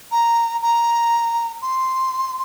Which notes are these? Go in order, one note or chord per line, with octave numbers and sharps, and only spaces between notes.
A#5
A#5
C6